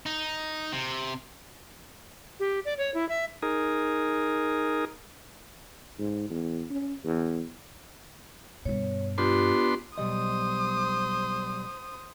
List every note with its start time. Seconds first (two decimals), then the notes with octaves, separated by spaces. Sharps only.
0.06 D#4
0.73 C3
2.40 G4
2.65 D5
2.78 C#5
2.94 E4
3.09 E5
3.43 D#4 G#4 A#4
5.99 G#2
6.30 E2
6.71 C#4
7.04 E2
8.65 G2 B2 C#5
9.18 B3 D4 F4 G4 C6
9.98 B1 G3 C5 D#5 D#6